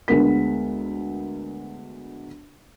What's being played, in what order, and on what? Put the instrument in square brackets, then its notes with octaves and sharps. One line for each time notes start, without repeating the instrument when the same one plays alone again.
[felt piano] D2 G#3 B3 A#4 B6